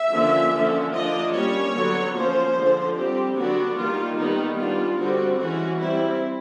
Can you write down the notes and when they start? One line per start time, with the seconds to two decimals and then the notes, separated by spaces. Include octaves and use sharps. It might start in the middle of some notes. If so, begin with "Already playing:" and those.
Already playing: E5
0.12 D3 F3 A#3 C#4
0.53 D3 F3 A#3 C#4
0.93 F3 A#3 D4 D#5
1.33 G3 A#3 C#4 C#5
1.73 D3 F#3 B3 D4
2.14 F3 A#3 C#4 C5
2.56 D3 F3 G#3
2.96 G3 C4 G4
3.36 D3 F#3 B3 D4 F#4
3.77 D#3 G3 A#3 F4
4.17 D#3 G3 B3 D#4
4.57 G3 B3 D4 F4
4.98 D3 G3 C4 F#4
5.39 E3 G#3 C#4 F#4
5.79 G3 C4 E4